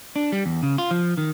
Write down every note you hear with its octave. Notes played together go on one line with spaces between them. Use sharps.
D4
G3
E2
C#3
F4
F3
D#3